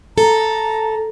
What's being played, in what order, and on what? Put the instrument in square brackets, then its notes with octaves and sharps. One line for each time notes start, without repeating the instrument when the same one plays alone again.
[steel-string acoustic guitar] A4 [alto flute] A#5